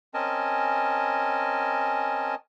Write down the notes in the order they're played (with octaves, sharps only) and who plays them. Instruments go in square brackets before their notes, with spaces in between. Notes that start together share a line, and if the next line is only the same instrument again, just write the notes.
[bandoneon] C4 C#4 A#4 D#5 G#5 A5